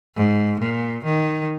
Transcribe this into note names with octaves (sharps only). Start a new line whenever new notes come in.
G#2
A#2
D#3